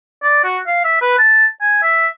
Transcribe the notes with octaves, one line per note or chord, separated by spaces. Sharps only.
D5
F#4
F5
E5
B4
A5
G#5
E5